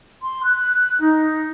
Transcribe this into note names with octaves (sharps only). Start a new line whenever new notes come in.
C6
F#6
D#4